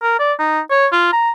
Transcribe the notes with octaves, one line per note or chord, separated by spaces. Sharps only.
A#4
D5
D#4
C#5
F4
A#5